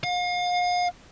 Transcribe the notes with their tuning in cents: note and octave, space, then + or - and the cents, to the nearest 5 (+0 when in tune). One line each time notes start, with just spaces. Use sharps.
F5 +40